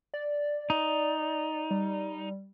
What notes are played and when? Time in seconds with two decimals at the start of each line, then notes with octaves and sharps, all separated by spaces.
0.14 D5
0.70 D#4
1.71 G3